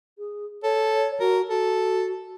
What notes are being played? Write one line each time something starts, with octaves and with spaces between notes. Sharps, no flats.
G#4
A4 C#5
F#4 A#4
F#4 A4